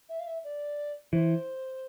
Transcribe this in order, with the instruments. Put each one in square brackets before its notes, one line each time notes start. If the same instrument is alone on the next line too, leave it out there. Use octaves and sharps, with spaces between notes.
[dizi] E5
F5
E5
D5
[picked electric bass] E3 [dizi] C5